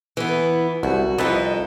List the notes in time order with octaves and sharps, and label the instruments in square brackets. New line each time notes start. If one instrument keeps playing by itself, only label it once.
[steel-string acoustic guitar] E3 B3
[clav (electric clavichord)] C2 [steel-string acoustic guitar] F#4
[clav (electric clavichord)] C2 A4 B4 [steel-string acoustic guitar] F2 D#4 E4